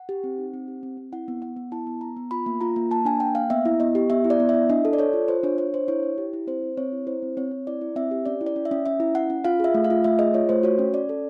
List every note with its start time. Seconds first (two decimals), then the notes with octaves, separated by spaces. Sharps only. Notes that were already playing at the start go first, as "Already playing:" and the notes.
Already playing: F#5
0.09 G4
0.24 C4
0.38 D#4
0.54 C4
0.68 G4
0.83 C4
0.97 C4
1.12 E4 F#5
1.28 B3
1.42 B3 F#5
1.56 B3
1.72 E4 A5
1.87 B3
2.01 B3 A#5
2.17 B3
2.31 F4 B5
2.46 A#3
2.61 F4 A#5
2.76 A#3
2.91 A#3 A5
3.05 D4 G#5
3.20 A#3 G5
3.35 A#3 F5
3.50 B3 E5
3.65 E4
3.80 B3 D#5
3.95 G4
4.10 B3 E5
4.24 E4
4.30 D5
4.40 B3
4.49 E4 E5
4.69 D4 D#5
4.85 A4
4.93 D5
4.98 A4 C#5
5.13 F4
5.28 F4 C5
5.43 D4 C#5
5.58 D4 C#5
5.74 D4 C5
5.88 E4 C#5
6.03 E4
6.18 G4
6.33 E4
6.47 C4 C5
6.63 C4
6.77 C4 C#5
6.92 E4
7.07 E4 C5
7.22 C4
7.37 C4 C#5
7.51 C4
7.67 E4 D5
7.81 E4
7.96 C4 E5
8.11 G4
8.26 C#4 D5
8.41 E4
8.46 D5
8.56 C#4
8.65 E5
8.71 C#4
8.86 C#4 E5
9.00 E4
9.15 C#4 F#5
9.30 C#4
9.44 F4 F5
9.60 G#4 E5
9.74 A3
9.84 F5
9.90 F4
10.04 A3 E5
10.19 G#4 D#5
10.34 F4 C#5
10.49 A3 C5
10.63 F#4 C#5
10.79 C#4
10.93 C#4 D5
11.09 A4